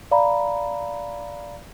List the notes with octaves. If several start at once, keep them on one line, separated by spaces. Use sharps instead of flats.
D5 F5 A#5 B5